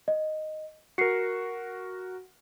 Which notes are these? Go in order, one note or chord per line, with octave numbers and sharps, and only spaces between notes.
D#5
F#4 A#4 C7 C#7